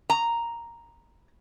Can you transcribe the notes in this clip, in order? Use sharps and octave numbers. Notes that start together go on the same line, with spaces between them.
A#5